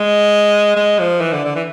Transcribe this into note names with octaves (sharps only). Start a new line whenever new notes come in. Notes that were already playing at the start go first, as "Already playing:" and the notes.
Already playing: G#3
G#3
F3
E3
D3
D3
E3